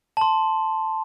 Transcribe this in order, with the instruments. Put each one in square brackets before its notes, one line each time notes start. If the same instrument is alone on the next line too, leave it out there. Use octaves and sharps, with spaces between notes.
[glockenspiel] A5 C6